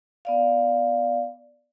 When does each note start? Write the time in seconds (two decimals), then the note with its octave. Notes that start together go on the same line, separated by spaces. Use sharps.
0.25 B3 D5 F5